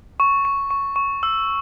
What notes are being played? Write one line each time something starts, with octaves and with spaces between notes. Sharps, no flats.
C#6
C#6
C#6
C#6
E6